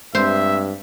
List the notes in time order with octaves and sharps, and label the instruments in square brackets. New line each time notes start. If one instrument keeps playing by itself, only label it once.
[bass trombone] G2 [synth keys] G#3 C4 [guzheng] C5 [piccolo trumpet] E5